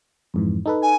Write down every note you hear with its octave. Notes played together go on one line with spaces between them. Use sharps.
F2 G#2 E3
D#4 A4 B4
G#5